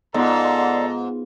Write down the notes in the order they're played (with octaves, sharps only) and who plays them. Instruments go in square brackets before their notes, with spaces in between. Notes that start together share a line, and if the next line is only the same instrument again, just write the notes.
[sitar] G#2 [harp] B3 F4 [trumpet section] A4 A#5 [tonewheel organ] D5 D#5 C6